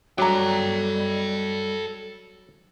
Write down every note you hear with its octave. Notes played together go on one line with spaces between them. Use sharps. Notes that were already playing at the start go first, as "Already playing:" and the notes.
F#3 G3 D4 A4 G5 A#5